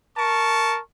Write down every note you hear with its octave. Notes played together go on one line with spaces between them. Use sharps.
A#4 A5 C#6